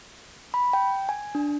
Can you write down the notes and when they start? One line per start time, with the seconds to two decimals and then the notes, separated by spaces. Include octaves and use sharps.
0.54 B5
0.73 G5
1.09 G#5
1.35 D4